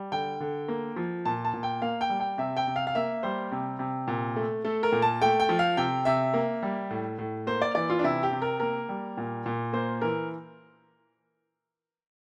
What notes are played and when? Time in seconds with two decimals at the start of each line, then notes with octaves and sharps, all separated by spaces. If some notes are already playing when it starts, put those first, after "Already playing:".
Already playing: G3
0.12 D3 G5
0.40 D3
0.68 A#3
0.96 F3
1.25 A#2 A5
1.45 A5
1.53 A#2
1.63 G5
1.82 A#3 F5
2.01 G5
2.09 G3
2.20 G5
2.38 C3 E5
2.57 G5
2.67 C3
2.76 F5
2.87 F5
2.95 A#3 E5
3.23 G3 C5
3.52 C3
3.79 C3
4.07 A#2
4.36 A3
4.64 A3 A4
4.83 A#4
4.92 A#2
5.02 A5
5.22 A3 G5
5.40 G5
5.49 F3
5.59 F5
5.77 C3 G5
6.05 C3 E5
6.34 A#3
6.63 G3
6.90 A2
7.18 A2
7.47 A#3 C5
7.62 D5
7.75 E3 D5
7.90 F4
7.99 D4
8.04 C3 E4
8.23 G4
8.31 C3
8.42 A#4
8.60 A#3 A#4
8.89 G3
9.17 A#2
9.46 A#2
9.73 A#3 C5
10.01 E3 A#4